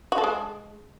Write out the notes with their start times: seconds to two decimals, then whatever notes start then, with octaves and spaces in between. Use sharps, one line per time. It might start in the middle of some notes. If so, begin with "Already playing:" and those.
0.12 F#4
0.18 A4
0.24 G#3